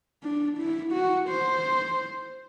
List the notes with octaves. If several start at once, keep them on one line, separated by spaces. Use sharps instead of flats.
D4
E4
F#4
C5